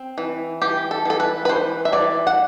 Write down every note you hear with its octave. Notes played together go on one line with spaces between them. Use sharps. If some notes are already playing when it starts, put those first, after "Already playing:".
Already playing: C4
E3
E3 G4
A4
E3 A4
B4
B4
E3 C5
E5
E3 D5
F#5